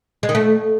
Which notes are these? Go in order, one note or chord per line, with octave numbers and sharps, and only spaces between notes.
G#3
D#3
A3